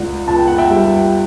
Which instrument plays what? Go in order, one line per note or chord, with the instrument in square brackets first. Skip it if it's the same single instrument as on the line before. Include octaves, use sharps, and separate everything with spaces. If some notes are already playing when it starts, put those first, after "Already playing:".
Already playing: [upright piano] C#2 D5 F#5
C#2 A5
G5
F#5
E5 G5
G3